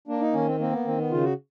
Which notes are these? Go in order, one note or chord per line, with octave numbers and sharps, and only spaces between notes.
A#3 D4
D#4
D#3 C#4
C4
A#3 C4
B3
D#3 C4
B3
C#3 F4
F#4